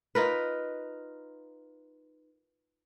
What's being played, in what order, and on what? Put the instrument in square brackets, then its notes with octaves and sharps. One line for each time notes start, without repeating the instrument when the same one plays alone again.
[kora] D#4 F4 A#4 B4